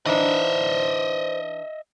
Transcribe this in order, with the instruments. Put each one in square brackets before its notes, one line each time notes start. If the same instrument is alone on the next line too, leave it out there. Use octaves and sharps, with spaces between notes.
[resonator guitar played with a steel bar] E3 D4 D#4 [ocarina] C5 [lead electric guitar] D#5 E5